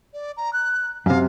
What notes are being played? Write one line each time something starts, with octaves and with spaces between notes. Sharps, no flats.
D5
A#5
F#6
F#2 C3 F5